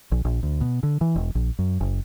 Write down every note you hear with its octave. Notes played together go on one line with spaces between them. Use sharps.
A#1
A#1
D2
B2
D3
E3
E1
A#1
F#2
F#1